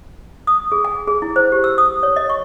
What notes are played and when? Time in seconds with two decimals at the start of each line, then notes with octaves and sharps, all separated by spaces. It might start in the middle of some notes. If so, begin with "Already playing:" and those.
0.47 D#6
0.72 G#4
0.85 G#5
1.08 G#4
1.22 E4
1.36 C5
1.52 G4
1.64 E6
1.78 D#6
2.03 C#5
2.16 D#5
2.29 C#6